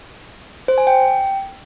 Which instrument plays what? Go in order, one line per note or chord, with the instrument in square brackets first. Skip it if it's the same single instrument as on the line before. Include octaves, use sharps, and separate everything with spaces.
[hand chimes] C5
G#5
G5